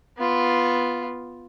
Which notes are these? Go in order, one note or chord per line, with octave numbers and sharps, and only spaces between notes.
B3 F4